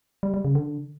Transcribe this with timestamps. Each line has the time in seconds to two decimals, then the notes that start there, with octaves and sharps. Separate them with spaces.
0.23 G3
0.34 G3
0.45 C#3
0.55 D3